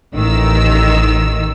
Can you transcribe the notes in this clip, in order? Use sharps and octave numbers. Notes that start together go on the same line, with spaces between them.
A1 D#3 E6